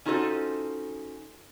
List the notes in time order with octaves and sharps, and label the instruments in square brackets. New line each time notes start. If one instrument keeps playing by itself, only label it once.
[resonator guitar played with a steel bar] C#4 D#4 F4 F#4 A4 C5